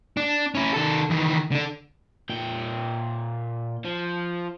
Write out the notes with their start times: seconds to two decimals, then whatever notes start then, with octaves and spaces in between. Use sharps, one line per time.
0.17 D4
0.55 C#4 E4
0.74 D#3 A4
1.10 D#3 E3
1.51 D3 D4
2.30 A#2 G5
3.84 F3